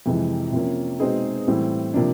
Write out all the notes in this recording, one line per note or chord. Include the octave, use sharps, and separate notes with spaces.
F2 C3 E3 G#3
C3 F3 A#3 C#4
B2 G#3 C4 D#4 G#4
A2 E3 G3 C4
C3 F3 A#3 D4